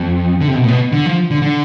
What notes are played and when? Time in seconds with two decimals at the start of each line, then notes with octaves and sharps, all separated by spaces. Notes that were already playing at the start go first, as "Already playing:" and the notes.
Already playing: F2
0.40 D3
0.48 C3
0.55 B2
0.64 A2
0.68 B2
0.92 D3
1.06 F3
1.31 D3
1.42 D3